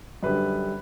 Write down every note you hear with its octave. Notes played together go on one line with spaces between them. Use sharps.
F#2 D3 G3 B4